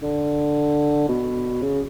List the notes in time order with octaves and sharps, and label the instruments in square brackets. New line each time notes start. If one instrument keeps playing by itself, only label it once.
[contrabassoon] D3
B2
C#3